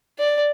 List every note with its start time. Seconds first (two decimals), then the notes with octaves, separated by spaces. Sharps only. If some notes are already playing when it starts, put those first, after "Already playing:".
0.19 D5